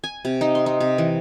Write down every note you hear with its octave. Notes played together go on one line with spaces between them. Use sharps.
G#5
C3
D#4
C6
D#4
C3
E3